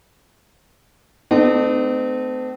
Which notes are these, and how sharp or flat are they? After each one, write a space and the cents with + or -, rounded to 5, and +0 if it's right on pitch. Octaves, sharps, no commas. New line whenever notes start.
A3 +0 C4 -40 D#4 -40